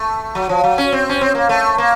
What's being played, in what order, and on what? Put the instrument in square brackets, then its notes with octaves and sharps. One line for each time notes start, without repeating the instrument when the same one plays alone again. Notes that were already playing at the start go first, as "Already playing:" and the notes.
Already playing: [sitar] A3
F#3
F3
F#3
C#4
C4
C#4
C4
A#3
A3
A#3